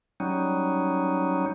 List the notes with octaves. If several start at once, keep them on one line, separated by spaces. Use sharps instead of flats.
F#3 G3 C#4 D#4